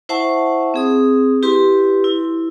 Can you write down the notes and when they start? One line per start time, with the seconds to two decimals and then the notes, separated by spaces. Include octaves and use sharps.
0.09 E4 C5 E5 F#5 A5 C#6
0.74 C4 G#4 D#6
1.42 E4 G4 B4 C6
2.04 E4